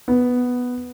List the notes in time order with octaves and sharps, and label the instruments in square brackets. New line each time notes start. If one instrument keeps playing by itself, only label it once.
[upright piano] B3